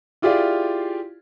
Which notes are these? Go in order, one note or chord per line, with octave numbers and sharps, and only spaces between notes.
E4 F4 G4 G#4 D5 F5